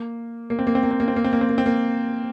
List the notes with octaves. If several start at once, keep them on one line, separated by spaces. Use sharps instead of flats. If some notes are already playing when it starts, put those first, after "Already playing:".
Already playing: A#3
A#3
C4
A#3
C4
A#3
C4
A#3
C4
A#3
C4
A#3
C4
A#3
C4
A#3